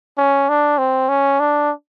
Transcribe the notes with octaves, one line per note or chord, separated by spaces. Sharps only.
C#4
D4
C4
C#4
D4